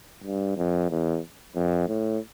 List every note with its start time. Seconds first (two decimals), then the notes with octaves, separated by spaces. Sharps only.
0.24 G2
0.57 F2
0.90 E2
1.56 F2
1.89 A2